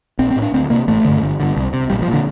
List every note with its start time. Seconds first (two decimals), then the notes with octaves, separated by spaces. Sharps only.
0.19 A#1 C4
0.31 C4
0.36 A2
0.42 D4
0.54 D2 C4
0.70 C3 A#3
0.87 A1 A3
1.05 G2 D3
1.21 G1
1.40 G2 D3
1.57 C2
1.73 C3
1.90 A#1 G3
2.02 F3
2.08 A#2 D3